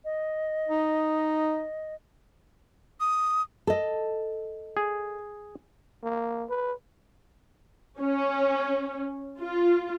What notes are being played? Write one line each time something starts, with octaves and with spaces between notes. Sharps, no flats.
D#5
D#4
D#6
A4 D#5
G#4
A#3
B4
C#4
F4